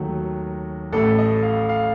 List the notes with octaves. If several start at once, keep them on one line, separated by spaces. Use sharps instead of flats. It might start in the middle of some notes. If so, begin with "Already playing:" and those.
Already playing: D#2 D#3 F#3 A3 F#4
A1 A2 A3 A4
D#5
F5
F5